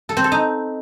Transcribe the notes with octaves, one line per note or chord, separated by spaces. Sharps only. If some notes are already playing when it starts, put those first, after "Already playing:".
A4
C4
A4
D#4